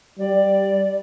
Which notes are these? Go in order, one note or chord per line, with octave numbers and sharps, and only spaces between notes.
G3 D5